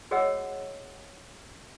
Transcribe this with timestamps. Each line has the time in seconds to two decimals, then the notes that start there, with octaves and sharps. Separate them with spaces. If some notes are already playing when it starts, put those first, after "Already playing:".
0.11 F#4 G#4 C#5 D#5 F#5 E6